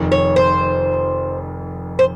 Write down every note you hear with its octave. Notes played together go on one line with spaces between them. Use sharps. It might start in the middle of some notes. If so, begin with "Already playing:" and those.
Already playing: F1 F2 D#3
C#5
C5
C5